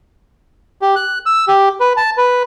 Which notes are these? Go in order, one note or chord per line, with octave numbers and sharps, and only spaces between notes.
G4
F#6
E6
G4
B4
A5
B4